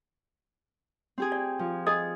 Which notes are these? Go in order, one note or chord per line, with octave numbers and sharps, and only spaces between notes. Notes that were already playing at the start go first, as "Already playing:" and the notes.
C4 G4 G#4
D5
F3
G#4 A4 D#5 D#6